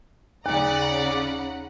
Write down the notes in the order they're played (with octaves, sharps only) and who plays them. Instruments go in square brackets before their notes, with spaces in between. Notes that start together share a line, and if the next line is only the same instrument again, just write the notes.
[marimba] D#2 [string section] C#3 [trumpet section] D5 [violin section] F#5 A#5 B5